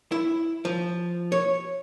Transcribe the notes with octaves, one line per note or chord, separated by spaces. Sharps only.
E4
F3
C#5